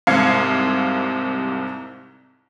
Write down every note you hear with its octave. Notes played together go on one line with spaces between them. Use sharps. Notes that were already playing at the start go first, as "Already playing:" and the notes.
C2 G#2 C3 F5 G#6 C#7